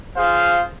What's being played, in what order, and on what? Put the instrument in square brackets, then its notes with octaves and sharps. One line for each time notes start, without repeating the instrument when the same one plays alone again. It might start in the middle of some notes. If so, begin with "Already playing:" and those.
[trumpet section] F4 G#4 C5 F5